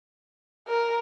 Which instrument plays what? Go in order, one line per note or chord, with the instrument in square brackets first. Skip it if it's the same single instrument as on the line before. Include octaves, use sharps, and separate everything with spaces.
[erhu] A#4